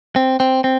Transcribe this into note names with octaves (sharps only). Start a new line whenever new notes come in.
C4
C4
C4